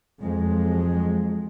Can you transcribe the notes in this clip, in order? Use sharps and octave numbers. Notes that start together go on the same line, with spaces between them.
F2 F#3 G#3